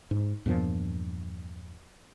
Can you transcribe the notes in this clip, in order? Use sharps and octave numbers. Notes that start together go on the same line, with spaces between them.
G#2
E2 G2 A#2 F3